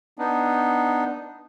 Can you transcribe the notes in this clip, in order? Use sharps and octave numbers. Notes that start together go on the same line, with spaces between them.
B3 D4 D#4